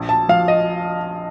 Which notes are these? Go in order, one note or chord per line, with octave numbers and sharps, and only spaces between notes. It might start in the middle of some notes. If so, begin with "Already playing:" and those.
Already playing: A#1
A5
F3 F5
D#5